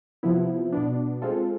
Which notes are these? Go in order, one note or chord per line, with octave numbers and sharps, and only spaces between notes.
C3 F3 B3 E4
B2 B3 D4
G#3 C4 F4 A4